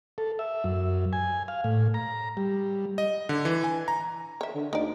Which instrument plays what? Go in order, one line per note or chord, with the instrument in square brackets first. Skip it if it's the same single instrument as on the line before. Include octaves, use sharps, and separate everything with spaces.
[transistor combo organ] A4
E5
F#2
G#5
F5
A2
A#5
G3
[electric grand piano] D#5
D3
E3
G#5
A#5
[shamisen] C#5 E5
[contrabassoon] D3
[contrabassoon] D2 [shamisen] D#4 D5